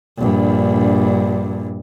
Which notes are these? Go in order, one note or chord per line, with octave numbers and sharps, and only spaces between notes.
A#1 G2